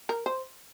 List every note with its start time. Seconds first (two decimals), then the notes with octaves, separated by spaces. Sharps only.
0.09 A#4
0.26 C5